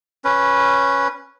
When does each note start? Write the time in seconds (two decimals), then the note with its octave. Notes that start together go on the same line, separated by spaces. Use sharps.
0.24 C#4 B4